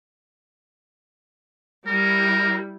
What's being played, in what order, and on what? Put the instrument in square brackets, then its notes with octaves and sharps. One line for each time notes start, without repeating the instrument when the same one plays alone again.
[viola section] G3 E4 [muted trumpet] A#4